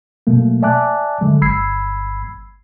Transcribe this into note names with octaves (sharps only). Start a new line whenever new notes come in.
B2 F#3 A3 A#3
D5 E5 G#5 A5 D6 F#6
D3 F#3 G#3
G1 B5 E6 G#6 C7